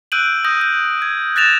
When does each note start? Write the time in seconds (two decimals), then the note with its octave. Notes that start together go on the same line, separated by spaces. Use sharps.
0.12 E6 F#6 G6 D7 D#7 F#7
0.45 D#6 G6 A#6 F#7
0.61 G6
1.02 G#6
1.36 F#6 A6 A#6 E7 F7